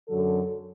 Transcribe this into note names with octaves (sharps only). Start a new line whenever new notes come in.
F#2 D3 F#3 A4